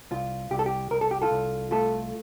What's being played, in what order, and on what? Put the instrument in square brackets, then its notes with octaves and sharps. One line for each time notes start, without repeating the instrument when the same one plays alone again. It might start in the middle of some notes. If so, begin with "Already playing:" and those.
[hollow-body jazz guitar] C2 F4
C2 G4
A4
G4
C2 A#4
A4
G4
F4 A4
C2
A3 F4 A4